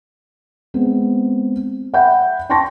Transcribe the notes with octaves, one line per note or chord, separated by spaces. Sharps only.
G#3 B3 C4
E5 F#5 G5 B5 G6
G5 A5 C6 C#6 A#6